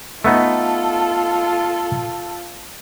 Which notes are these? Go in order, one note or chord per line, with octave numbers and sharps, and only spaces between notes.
A3 B3 D#4 F4 A4